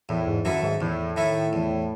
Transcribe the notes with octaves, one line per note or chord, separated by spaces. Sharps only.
E2 A2
G#2
F#2 D#3 A3 E4 A4
G#2
E2 A2
D#3 A3 E4 A4
E2